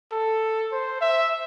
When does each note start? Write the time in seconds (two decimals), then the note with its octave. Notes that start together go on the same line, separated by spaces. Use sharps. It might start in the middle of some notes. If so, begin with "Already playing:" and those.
0.12 A4
0.72 C5
1.01 E5